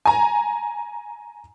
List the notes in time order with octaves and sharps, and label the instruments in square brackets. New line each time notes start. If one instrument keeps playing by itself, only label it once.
[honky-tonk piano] G#5 A#5